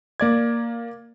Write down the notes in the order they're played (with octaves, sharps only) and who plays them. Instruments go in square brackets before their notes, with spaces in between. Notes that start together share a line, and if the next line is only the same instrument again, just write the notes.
[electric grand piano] A#3 D5 G#6